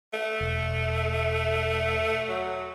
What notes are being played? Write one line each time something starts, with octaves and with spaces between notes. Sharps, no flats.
A3
E1
F#3